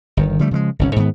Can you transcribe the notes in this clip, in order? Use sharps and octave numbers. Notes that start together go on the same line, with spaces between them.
G1 D#3
D3 F3 G3 A3
C#3 F3 G3 G#3
G1 C2 C#4
G#2 D#3 B3